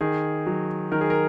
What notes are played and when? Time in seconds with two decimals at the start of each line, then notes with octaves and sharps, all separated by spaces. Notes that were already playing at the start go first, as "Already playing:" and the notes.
0.01 D#3 G#4
0.46 F#3
0.92 D#3 A#4
1.01 G#4
1.10 A#4